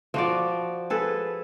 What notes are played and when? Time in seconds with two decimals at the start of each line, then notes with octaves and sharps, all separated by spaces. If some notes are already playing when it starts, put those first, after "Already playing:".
0.14 F3 F#4 D5
0.90 G#4 A4 B4